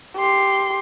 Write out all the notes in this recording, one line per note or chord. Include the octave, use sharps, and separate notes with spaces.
G4 C6